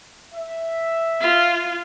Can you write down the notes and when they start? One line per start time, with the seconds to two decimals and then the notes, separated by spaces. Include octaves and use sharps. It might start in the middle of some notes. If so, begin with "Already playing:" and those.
0.34 E5
1.20 F4